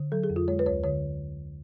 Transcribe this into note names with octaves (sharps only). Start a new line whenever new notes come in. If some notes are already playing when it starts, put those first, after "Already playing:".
Already playing: D3
F#3 A4
G#4
F2
F4
G#3 C#5
B4
D2 C#5
D3 C#5